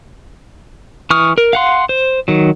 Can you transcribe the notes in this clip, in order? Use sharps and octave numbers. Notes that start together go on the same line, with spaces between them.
E3 C#6 D#6 F6
A#4
F5 F#5 C6
C5
D#3 F#3